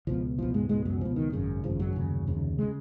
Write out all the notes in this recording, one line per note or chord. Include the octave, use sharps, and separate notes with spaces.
C#2 B2 F3
C#2 B2 F3
G#2 G#3
C#2 G#2 B2 G#3
F#2 F#3
C#2 B2 F3
D#3
G#1 F#2 C#3
G#1 F#2 C#3 F3
F#2 F#3
F1 D#2 C#3
F1 D#2 C#3
C#3 G#3